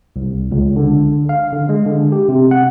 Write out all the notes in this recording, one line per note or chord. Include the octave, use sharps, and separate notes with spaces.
C2
C#2
D3
F5
D3
G#3
D3
G4
C3
F#5